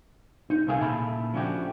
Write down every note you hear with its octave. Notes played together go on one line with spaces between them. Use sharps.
D#4
C2 C3 D#3 A3 G#4 F5
A#2 C#3 E4 A4 A5 B5
F3 A3 C#4 D4 F#4 G4